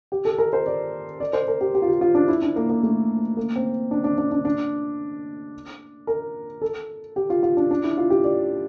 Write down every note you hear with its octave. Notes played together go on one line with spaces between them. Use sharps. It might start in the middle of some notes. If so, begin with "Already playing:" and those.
G4
A4
A#4
C5
D5
D5
C5
A#4
G4
G4
F4
G4
F4
D4
E4
D4
A#3
A#3
A3
A#3
C4
D4
D4
D4
D4
D4
A#4
A4
G4
F4
F4
D4
D4
E4
F4
G4
D5